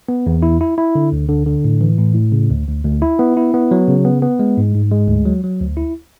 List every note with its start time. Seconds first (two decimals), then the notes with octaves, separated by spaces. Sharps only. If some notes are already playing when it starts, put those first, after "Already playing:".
0.09 B3
0.26 E2
0.43 E4
0.61 E4
0.78 E4
0.95 D3
1.12 D2
1.29 D3
1.46 D3
1.64 A2
1.81 E3
1.98 A2
2.15 A2
2.32 C#3
2.50 D2
2.67 D2
2.84 D2
3.02 E4
3.19 B3
3.37 E4
3.54 B3
3.71 F#3
3.88 C#3
4.05 B3
4.22 B3
4.39 G#3
4.57 G#2
4.74 G#2
4.91 G#3
5.08 D2
5.25 F#3
5.44 F#3
5.61 D2
5.77 E4